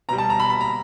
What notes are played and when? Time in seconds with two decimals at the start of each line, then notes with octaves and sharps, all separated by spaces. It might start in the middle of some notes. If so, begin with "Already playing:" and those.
0.09 B2 G3 A#5
0.18 A5
0.30 A#5
0.40 B5
0.50 B5
0.61 A#5